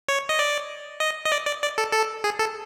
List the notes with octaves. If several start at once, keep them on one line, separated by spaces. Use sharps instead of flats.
C#5
D#5
D5
D#5
D#5
D5
D5
D5
A4
A4
G#4
A4